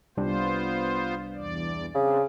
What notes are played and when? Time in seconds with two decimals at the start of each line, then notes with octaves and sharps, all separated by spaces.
0.17 C2 G3 B3 D4 F4 C5
1.34 E2 D5
1.95 C#3 C4 D4